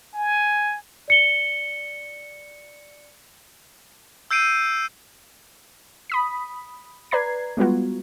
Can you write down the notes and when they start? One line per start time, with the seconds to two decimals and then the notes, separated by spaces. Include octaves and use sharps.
0.14 G#5
1.08 D5 C#7 G7
4.31 E6 G6 C7 D7 D#7
6.10 B5 D#6 B6
7.11 B4 D5 A#5 G#6 C7
7.57 G3 G#3 B3 F4 F#4